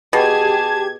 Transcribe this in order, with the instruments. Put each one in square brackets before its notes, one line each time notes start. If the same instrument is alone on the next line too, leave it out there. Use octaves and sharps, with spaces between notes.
[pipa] B2 [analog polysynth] G4 G#6 [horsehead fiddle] G#4 [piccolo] A5